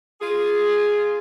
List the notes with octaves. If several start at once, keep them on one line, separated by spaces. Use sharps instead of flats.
F4 G#4